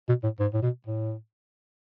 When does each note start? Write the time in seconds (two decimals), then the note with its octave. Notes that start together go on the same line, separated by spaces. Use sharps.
0.09 B2
0.23 A2
0.39 G#2
0.54 A2
0.62 B2
0.86 A2